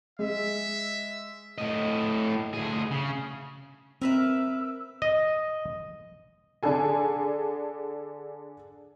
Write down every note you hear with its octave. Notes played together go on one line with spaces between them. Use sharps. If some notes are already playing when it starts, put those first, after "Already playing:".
G#3 E5
A2 D#5
D2 G#4
C#3
C4 A#4 B4 E5 E6
D#5
D3 D4 G#4 A4 G#5